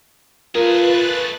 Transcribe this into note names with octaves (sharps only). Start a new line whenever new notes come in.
A3 F4 G#4 A#4 B4 F#6 A6